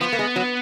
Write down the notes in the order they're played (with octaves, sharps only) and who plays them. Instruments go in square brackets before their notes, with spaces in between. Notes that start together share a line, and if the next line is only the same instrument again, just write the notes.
[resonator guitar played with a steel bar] F3 [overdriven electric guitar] B3
[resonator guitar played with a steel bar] A#3
G#3
F#3